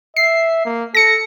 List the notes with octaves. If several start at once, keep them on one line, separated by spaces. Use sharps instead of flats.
E5 C7
A#3
A4 A#6 C#7